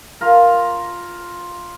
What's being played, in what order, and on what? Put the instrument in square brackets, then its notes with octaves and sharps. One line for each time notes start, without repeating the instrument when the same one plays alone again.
[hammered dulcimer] F4 A#4